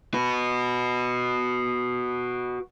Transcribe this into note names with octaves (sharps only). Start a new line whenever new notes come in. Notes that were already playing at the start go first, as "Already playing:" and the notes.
F#4 B4